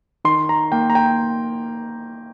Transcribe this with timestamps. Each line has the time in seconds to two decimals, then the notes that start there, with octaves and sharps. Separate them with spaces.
0.25 D#3 C6
0.49 A#5
0.72 A#3 G5
0.90 A#5
0.95 G5